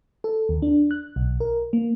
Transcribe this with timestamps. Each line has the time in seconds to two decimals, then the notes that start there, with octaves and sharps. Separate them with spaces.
0.24 A4
0.49 D#2
0.62 D4
0.91 F#6
1.16 B1
1.40 A#4
1.73 A#3